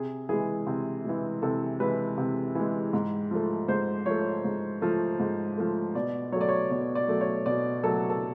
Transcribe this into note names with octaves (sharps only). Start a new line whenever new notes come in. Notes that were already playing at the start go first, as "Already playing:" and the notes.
Already playing: C3 G#4
E3 G#3 G#4
C3
E3 G#3
C3 A4
E3 G#3 B4
C3
E3 G#3
G#2
F3 A3
G#2 C5
F3 A3 C#5
G#2
F3 A3
G#2
F3 A3
B2 D5
F#3 A3 C#5 D5
C#5
B2 D5
D5
F#3 A3
C#5
B2 D5
F#3 A3 A4
A4